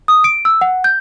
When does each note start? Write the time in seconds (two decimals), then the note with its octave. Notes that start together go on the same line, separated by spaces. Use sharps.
0.08 D#6
0.24 D7
0.45 E6
0.61 F#5
0.84 G6